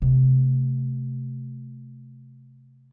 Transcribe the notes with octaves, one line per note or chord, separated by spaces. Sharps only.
C3 A3